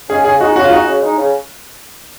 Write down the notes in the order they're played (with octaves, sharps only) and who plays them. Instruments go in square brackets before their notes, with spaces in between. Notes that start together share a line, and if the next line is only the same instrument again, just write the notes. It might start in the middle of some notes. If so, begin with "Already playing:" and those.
[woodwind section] C#3 G#3 C#4 [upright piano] G#4
[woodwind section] C#3 [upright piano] G#4
[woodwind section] G#3 D#4 [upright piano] F#4
[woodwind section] C#3 [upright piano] F#4
[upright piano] F4
[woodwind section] G#3 D#4 [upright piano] F#4
[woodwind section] C#3
G#3 D#4
C#3